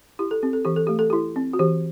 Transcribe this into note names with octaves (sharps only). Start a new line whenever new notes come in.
E4 G4
A4
C4 G4
A4
E3 G4
A4
A3 G4
A4
E4 G4
C4
F#4
E3 G4